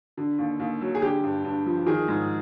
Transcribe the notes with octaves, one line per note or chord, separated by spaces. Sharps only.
D3
D#2
D#2
F#3
G#4
D3 G4
G2
G2
F3
D#3 G#4
G#2